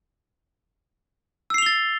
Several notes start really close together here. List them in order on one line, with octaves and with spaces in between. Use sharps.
E6 C7 F7 G7 A6